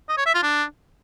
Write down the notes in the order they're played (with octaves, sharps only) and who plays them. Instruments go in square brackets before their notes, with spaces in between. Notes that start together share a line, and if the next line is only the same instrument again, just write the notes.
[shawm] D#5
C#5
E5
F4
D4